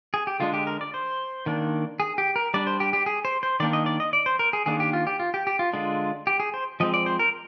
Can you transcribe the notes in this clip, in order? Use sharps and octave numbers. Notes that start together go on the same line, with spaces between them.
G#4
G4
D3 G#3 D4 F4
G4
A#4
D5
C5
D#3 A#3 D4
G#4
G4
A#4
G3 D4 D5
C5
G4
G4
G#4
C5
C5
D#3 A#3 D4 D5
D#5
D5
D#5
D5
C5
A#4
G#4
D#3 A#3 D4 G#4
G4
F4
G4
F4
G4
G4
F4
D3 G#3 D4 F4
G4
G#4
C5
F3 G#3 C4 D#5
D5
C5
A#4